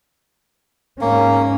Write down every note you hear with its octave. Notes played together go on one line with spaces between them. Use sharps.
G#2 A#3 C#4